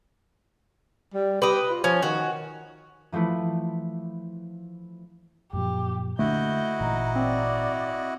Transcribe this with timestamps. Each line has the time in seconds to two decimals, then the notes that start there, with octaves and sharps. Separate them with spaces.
1.14 G3
1.42 G4 B4 D#5
1.69 F4
1.84 F3 C#4
2.03 D#3 F#4
3.12 E3 F3 A3 E4 B4
5.53 F#2 A#2 F3 G4
6.19 D3 A3 A#3 D4 E4 F#4 D#5 G6
6.80 G#1 A#2 E3 D#4
7.16 C4 D5